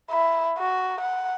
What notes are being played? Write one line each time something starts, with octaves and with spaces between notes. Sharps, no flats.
E4
F#4
F#5